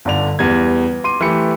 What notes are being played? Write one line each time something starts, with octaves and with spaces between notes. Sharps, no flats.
G1 D3 D5 F7
E2 G3 G#6
C6 D6 D#7
E3 A3 E4 G4 C#7